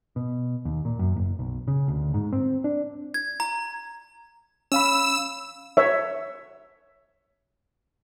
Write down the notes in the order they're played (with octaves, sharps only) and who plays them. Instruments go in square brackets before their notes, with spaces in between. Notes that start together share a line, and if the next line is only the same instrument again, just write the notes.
[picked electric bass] B2
D#2
A#2
F#2
F#1
B1
C#3
D2
G#2
C4
D4
[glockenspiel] G#6
A#5
[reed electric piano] C#4 F5 B5 [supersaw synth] E6
[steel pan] C#5 E5